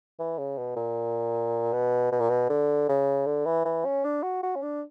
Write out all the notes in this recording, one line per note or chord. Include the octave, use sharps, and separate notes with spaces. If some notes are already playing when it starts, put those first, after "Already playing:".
E3
C#3
B2
A#2
B2
B2
A#2
B2
D3
C#3
D3
E3
E3
C#4
D4
F#4
F#4
C#4
D4